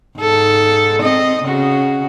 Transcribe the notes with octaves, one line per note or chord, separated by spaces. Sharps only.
G#2 A4
C4 D#5
C#3 F#4